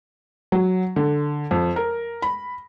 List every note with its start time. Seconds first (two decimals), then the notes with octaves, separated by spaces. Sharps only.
0.52 F#3
0.96 D3
1.51 F2
1.76 A#4
2.22 B5